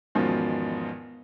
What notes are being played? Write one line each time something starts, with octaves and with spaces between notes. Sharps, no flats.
E2 G#2 B2 D#3 F3 C#4